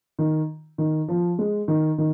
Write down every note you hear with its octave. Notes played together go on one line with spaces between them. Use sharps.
D#3
D#3
F3
G#3
D#3
D#3